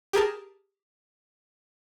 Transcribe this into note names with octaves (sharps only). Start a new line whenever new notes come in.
G4 G#4 A#4 A5